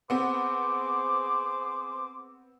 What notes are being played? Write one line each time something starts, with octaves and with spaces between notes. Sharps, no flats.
B3 C4 G#4 C5 D6